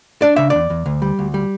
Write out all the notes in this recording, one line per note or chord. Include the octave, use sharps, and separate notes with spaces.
D4 D5
C#3 E5
E2 D5
E2
D2
G3
D2
G3